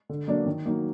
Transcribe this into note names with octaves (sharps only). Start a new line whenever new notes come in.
D3
F#3 A#3 D4
D#3
F#3 A#3 D#4